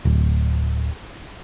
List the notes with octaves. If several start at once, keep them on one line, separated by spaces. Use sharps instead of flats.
D1